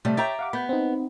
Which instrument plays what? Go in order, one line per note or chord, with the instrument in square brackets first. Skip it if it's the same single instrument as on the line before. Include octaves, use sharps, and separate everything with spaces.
[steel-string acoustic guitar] C3 G3 A3
[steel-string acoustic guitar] G4 E5 A#5 [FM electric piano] C#5 G5 A6
[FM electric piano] F5 F#5 D6
[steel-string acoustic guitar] B3 [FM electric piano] B5 G6
[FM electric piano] C4 D#4